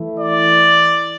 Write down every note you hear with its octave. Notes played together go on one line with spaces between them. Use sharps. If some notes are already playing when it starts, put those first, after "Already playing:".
Already playing: E3 A3 E4
D5